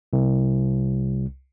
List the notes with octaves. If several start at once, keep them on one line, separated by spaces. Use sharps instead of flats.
C2